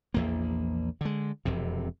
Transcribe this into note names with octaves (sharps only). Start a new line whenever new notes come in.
A#1 E2 A#3
D3 G#3
E1 F2 C3